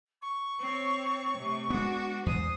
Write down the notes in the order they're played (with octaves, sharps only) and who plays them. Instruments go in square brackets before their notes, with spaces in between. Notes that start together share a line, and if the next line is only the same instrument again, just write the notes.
[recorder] C#6
[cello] C4 C#5
C3 A3
[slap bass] G#3 B3 [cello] D4 F#4
[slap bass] E2 G#3 [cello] C5 [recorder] D#6